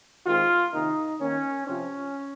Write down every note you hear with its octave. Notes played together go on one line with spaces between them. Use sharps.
D#3 G#3 C4 F4
C3 D#3 A#3 D#4
D#3 A#3 C#4
C3 F3 C4 C#4